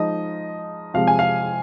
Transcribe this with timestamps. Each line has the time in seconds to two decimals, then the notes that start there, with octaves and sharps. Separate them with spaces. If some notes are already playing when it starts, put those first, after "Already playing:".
Already playing: F3 G#3 D#4 D#5
0.94 C3 F3 G#3 F5
1.07 G#5
1.19 F5